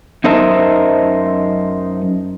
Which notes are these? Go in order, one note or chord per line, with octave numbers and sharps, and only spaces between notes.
F#2 D#4 A#4 C5 E5 A5